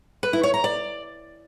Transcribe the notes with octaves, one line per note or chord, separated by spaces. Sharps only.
B4
E4
C#5
A#5
D5